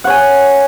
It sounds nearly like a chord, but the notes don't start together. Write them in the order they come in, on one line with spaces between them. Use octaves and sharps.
F#5 C#5 G#5